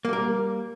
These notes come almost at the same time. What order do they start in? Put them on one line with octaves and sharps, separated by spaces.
A#3 G3 A#4